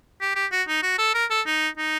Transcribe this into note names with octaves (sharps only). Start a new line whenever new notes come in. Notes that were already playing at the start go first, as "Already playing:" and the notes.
G4
G4
F#4
D#4
F#4
A4
A#4
A4
D#4
D#4